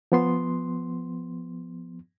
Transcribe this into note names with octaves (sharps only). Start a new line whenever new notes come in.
F3 B3 C6